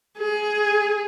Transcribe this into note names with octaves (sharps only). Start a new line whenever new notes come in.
G#4